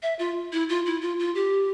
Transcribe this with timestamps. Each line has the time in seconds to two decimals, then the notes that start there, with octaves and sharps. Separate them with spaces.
0.03 E5
0.19 F4
0.52 E4
0.69 F4
0.86 E4
1.02 F4
1.19 F4
1.35 G4